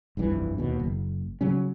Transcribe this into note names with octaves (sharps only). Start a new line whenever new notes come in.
F1 C2 G2 E3
D#2 B2
F#1
C#3 F#3 C#4